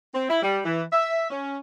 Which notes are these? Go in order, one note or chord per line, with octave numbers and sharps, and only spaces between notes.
C4
E4
G3
E3
E5
C#4